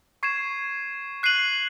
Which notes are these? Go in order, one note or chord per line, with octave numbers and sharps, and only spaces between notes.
C#6 G#6 C7 E7
F#6 C7 D#7 F#7